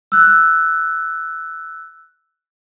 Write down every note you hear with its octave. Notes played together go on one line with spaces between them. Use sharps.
E6 F#6